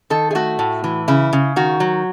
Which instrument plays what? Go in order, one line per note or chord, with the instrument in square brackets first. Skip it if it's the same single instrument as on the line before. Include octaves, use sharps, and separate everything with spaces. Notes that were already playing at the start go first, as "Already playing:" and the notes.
[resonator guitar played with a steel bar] D#3 A4
G#4
A3 F#4
A2
E3
C#3 E4
C#3
D#3 F#4
F#3